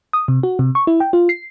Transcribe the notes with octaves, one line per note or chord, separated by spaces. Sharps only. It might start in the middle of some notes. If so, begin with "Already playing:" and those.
D#6
C3
F#4
C3
C#6
E4
G5
F4
C7